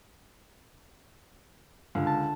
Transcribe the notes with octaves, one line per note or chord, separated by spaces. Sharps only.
C#2 G2 D3
A5